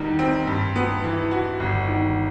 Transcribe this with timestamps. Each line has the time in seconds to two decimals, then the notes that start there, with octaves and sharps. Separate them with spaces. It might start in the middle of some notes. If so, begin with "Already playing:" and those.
Already playing: E2 D#3 G3
0.19 C4
0.47 G2
0.76 B3
1.04 E3
1.31 F#4
1.60 G1
1.88 D#3